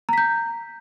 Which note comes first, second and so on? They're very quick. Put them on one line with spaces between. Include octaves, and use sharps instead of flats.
A#5 B6 G6